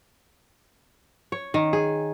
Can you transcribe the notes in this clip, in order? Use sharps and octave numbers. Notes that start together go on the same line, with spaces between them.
C#5
D#3
G#4